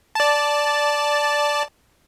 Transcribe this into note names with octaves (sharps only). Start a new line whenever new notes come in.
D5 A5